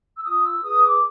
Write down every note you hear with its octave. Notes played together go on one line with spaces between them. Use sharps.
E6
F4 D#6
E6
G#4 B4 D#6
D6